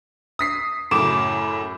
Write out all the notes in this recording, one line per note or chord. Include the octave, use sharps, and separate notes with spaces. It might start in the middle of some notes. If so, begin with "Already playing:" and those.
D#6 B6 C7
F#2 A2 C#3 D6 E7